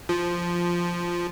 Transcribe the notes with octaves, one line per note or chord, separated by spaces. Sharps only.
F3